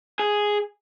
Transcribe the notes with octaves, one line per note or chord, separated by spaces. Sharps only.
G#4